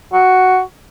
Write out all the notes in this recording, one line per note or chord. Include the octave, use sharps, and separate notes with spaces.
F#4